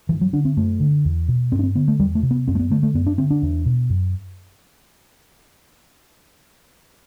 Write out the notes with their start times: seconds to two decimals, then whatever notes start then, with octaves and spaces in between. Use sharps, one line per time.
0.09 G2 E3
0.21 F#3
0.33 D3 D4
0.45 C4
0.57 F#2 A3
0.80 D3
1.05 E2
1.28 B2
1.52 G2 C4
1.59 D4
1.63 C4
1.75 D3 B3
1.88 A3
1.99 E2 G3
2.15 A3
2.23 C3
2.31 B3
2.48 F#2 C4
2.55 A3
2.59 B3
2.70 D3 A3
2.83 A3
2.94 F#2 B3
3.06 D4
3.18 D3 C4
3.30 D4
3.42 E2
3.66 B2
3.90 F#2